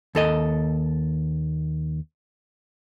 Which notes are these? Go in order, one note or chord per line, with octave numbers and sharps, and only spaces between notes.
D#2 A4 D#5